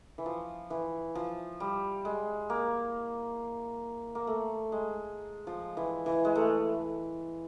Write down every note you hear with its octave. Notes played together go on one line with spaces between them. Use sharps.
E3
F3
E3
F3
G3
G#3
A#3
A#3
A3
G#3
F3
E3
E3
G#3
A3